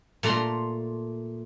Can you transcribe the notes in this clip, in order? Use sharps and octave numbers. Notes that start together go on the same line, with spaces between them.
A#2 A3 A#5 C6